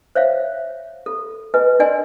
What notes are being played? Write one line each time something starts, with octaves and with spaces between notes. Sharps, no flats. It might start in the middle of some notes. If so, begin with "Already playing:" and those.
C5 C#5 E5 F5
A4
B4 D#5 G#5
D4 A#4 D5 D#5 G#5 C6